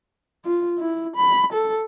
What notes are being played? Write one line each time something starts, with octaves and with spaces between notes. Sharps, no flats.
F4
E4
B5
A4